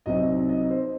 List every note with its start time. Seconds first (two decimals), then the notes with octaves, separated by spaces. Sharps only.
0.06 C2 C3 F#3 C4 D#4 D#5
0.49 D#5
0.71 C5